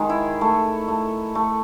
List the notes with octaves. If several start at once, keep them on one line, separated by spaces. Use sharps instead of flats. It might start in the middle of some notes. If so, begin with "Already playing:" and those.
Already playing: D#3 G#3
E4
A3
A3
A3